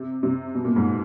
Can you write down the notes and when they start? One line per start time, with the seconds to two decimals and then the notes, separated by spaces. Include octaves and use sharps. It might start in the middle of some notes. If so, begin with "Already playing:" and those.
Already playing: C3
0.23 C3
0.55 B2
0.65 A#2
0.76 G#2